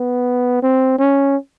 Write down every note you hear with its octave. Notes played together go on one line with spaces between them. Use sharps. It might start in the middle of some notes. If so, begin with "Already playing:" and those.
Already playing: B3
C4
C#4